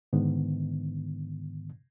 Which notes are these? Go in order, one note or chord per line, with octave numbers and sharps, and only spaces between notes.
G#2 D3 D#3 B3